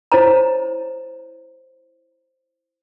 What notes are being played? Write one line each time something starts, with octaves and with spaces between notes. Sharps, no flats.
E4 C5 C#5 A#5